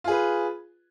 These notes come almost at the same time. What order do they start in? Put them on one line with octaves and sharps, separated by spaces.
F4 G#4 B4